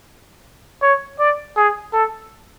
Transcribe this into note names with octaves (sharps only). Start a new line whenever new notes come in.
C#5
D5
G#4
A4